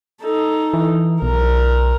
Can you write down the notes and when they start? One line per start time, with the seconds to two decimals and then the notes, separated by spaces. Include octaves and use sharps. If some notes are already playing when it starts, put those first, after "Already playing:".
0.22 D#4 A4
0.74 E3
1.22 B1 A#4